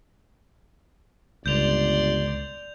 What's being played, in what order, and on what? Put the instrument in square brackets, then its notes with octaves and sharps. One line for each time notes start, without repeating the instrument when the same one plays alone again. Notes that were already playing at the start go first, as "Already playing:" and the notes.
[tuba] G1 [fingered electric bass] C#2 [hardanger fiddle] D5 C6 [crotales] G6 F7